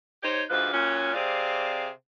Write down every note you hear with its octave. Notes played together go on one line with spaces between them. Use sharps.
D#4 G4 C5 C#5
D2 G#2 F3 B4
A#2 F#3 C#4
C3 C4 G#4 D5 F5